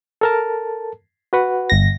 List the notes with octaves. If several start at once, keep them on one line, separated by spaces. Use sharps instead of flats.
A4 A#4 A5
F#4 B4 F#5
G1 A#6